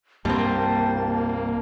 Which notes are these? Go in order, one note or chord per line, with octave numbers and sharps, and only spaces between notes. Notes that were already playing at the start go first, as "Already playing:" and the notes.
C2 G2 B2 G3 A#3 C4 A5